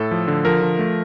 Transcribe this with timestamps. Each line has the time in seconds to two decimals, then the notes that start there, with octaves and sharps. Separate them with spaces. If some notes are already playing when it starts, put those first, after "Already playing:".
Already playing: A2 A4
0.11 F3
0.28 D3
0.45 F3 A#4
0.62 F3
0.79 A3